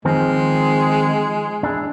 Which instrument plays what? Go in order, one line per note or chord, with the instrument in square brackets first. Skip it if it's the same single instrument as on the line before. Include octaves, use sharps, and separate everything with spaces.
[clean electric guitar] D#3 F3 C4 [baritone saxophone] G#3
[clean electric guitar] D4 E4 G#4